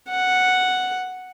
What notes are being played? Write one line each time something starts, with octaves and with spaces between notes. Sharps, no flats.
F#5